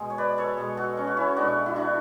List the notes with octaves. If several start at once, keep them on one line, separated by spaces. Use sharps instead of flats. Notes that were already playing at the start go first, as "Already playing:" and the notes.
Already playing: B2 G#3 G#4
C#5
B4 D5
A4 C#5
B2 G#3
F#4 A4
C#4
F#4
C#4 E4
B2 G#3 D4 F#4
E4
D4 F#4